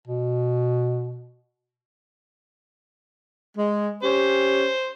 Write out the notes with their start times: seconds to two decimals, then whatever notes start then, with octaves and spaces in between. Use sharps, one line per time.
0.07 B2
3.57 G#3
4.03 C#4 G4 C5